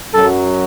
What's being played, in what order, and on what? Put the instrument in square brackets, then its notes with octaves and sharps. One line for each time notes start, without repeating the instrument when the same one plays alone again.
[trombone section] F#2 F#3 A4